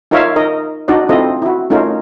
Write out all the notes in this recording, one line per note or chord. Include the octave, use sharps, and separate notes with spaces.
D#4 F4 A#4 C#5 E5 F5
D#4 A#4 D#5
D4 D#4 F#4 D5 D#5
C4 E4 F4 A4 D#5
E4 F#4
A3 C#4 D#4 F4 A4 A#4